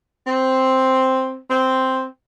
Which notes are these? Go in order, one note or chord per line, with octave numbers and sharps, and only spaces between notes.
C4
C4